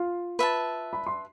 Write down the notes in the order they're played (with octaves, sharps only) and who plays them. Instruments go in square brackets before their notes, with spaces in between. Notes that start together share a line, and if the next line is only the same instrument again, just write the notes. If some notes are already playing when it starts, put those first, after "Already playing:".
Already playing: [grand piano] F4 F5
[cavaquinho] B4 E5 A5
[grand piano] B5
C6